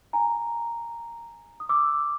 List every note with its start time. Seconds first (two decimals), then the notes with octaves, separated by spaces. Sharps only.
0.13 G#5 A#5
1.60 D#6
1.69 D6 E6